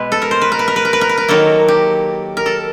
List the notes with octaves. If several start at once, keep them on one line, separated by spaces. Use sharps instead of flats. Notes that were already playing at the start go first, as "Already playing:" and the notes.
Already playing: B2 G#3 B4
A4
A#4
C5
B4
A#4
B4
A#4
B4
A#4
B4
A#4
B4
A#4
D#3 F#3 A#3 A4
G4
A#4
A4